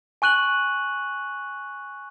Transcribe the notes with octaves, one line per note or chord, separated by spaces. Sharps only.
G#5 C#6 F#6 D#7 F#7